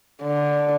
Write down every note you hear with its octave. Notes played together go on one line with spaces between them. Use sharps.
D3